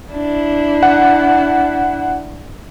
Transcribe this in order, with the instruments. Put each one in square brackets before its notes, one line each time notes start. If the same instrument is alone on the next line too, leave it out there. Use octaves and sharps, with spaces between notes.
[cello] D4 E4
[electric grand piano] F#5